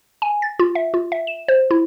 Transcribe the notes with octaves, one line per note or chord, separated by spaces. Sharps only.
G#5
A6
F4
E5
F4
E5
E7
C5
E4